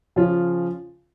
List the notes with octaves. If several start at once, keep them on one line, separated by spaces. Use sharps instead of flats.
C#3 F3 C#4 F4